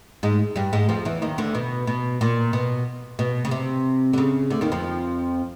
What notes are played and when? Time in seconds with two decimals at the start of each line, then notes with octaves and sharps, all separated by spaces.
0.23 G#2 G#3
0.56 G2 G3
0.73 G#2 G#3
0.89 F2 F3
1.05 E2 E3
1.22 D#2 D#3
1.38 D2 D3
1.55 B2
1.87 B2
2.21 A#2
2.53 B2
3.19 B2
3.45 C#3
3.51 C3
4.13 D3
4.18 C#3
4.50 D2 D3
4.61 D#2 D#3
4.72 F2 F3